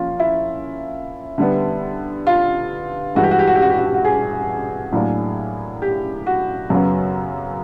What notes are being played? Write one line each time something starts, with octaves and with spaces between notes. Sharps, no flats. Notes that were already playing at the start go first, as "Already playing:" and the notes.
Already playing: F3 A#3 C#4 F4
E4
D3 G3 B3
F4
G2 E3 G#3 F#4
G4
F#4
G4
F#4
G4
F#4
G4
F#4
G4
F#4
G#4
A2 F#3 A#3 D4
G4
F#4
F#2 C#3 F#3 B3